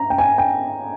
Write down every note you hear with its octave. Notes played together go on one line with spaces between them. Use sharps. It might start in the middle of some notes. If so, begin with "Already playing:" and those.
Already playing: A#5
G5
G#5
G5